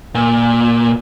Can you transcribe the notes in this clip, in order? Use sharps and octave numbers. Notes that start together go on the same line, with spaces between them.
A#2